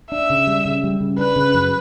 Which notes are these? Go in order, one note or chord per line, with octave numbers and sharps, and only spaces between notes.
D4 E5
C#3
G3
C#3
G3
C#3
D4 B4
C#3
F#2